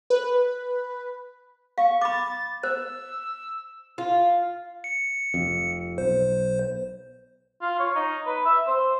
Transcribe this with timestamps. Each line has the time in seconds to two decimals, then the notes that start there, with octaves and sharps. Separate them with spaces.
0.10 B4
1.78 F5 C#6
2.01 B5 D6 A6
2.63 C5 E6
3.98 F4
4.84 C#7
5.34 F1 F2
5.98 B1 C5
7.62 F4
7.79 C#5
7.95 D#4
8.26 B4
8.45 E5
8.67 C5